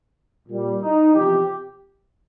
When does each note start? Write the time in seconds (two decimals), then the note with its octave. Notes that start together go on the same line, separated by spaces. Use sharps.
0.48 A#2 G3
0.81 D#4
1.14 E2 C3 F3 G4